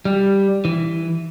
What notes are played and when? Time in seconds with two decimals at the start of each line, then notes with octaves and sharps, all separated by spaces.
0.05 G3
0.65 E3